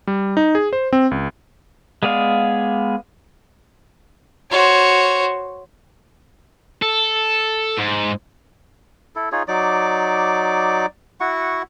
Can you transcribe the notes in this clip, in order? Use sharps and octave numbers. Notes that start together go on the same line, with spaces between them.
G3
D#4
G#4
C5
C4
C#2
G#3 B3 G#4 D5 F5
F#4 C5 C#5
A4
G#2
E4 A4
D#4 F4 G#4 C#5
F#3 D#4 D5 D6
E4 F#4 F#5 C#6